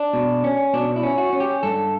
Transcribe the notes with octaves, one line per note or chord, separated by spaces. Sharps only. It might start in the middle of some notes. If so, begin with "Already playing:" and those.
Already playing: D4
B2
C#4
B2 D4
E4
C#4
F#4
C#4
G4
G2 A4